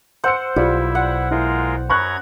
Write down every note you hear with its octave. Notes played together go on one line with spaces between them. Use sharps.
C5 F#5 C6 E6 C#7
B1 G3 E4 F4
F#5
G#3 E4 F4 A#4
F#2 A#5 B5 C#6 F#6 G#6